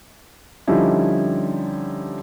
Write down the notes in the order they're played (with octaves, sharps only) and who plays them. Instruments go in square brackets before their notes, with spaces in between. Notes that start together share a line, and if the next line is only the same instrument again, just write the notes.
[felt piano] D3 F3 G3 C#4 D#4 E4